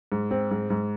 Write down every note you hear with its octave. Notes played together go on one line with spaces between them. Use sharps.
G#2
C4
G#2
G#2